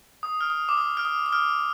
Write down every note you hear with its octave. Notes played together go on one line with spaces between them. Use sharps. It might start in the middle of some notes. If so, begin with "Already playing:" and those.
D#6
F6
D#6
D6
D#6
F6
D#6
D#6
F6